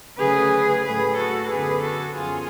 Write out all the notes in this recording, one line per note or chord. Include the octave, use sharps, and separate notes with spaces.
D2 C#3 F#3 A3 G#4 B4
A2 F#3 A3 G#4 B4
F#4 A4
F#2 D3 F#3 B3 G#4 B4
F#4 A4
F#2 F3 B3 F4 G#4